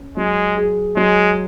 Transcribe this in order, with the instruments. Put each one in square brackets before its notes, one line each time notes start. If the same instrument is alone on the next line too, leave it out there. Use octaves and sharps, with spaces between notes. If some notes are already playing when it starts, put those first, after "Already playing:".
Already playing: [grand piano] C#4
[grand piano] F#3 [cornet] G#3
[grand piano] G#4
[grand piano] F#3 [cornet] G#3